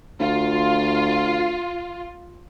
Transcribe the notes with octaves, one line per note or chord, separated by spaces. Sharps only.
D2 F4